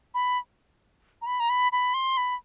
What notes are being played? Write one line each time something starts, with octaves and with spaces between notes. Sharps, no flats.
B5
A#5
B5
A#5
B5
B5
C6
B5